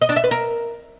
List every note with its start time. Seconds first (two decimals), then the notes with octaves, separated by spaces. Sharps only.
0.02 D#5
0.09 D4
0.16 E5
0.24 B4
0.31 A#4